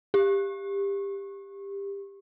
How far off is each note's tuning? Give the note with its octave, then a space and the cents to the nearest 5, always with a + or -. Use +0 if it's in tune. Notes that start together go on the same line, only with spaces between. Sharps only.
G4 +20